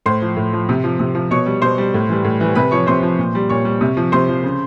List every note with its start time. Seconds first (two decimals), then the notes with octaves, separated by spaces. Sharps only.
0.06 A2 C5 C6
0.22 F3
0.36 A2
0.53 F3
0.69 C3
0.84 F3
0.99 C3
1.15 F3
1.31 B2 C#5 C#6
1.46 G3
1.62 B2 C5 C6
1.78 G3
1.94 A2
2.09 E3 G3
2.24 A2
2.40 E3 G3
2.55 C3 B4 B5
2.71 F3 C#5 C#6
2.87 C3 C5 C6
3.03 F3
3.19 A#2
3.35 G3
3.49 A#2 C#5 C#6
3.65 G3
3.81 C3
3.97 F3
4.12 C3 C5 C6
4.29 F3
4.43 C#3